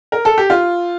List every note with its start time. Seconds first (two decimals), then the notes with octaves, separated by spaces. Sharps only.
0.12 A#4
0.25 A4
0.38 G4
0.50 F4